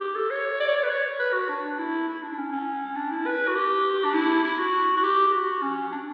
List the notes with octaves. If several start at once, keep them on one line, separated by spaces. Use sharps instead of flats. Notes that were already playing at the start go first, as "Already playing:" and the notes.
G4
A4
C#5
D5
C#5
D5
B4
C#5
B4
F#4
D4
E4
E4
D4
D4
C#4
C#4
D4
E4
B4
F#4
G4
D4
E4
E4
F#4
F#4
G4
G4
F#4
C#4
D4